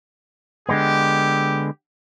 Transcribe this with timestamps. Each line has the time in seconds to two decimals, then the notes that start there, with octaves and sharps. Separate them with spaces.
0.69 D3 G#3 B3 G4